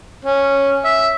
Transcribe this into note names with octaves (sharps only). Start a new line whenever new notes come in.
C#4
E5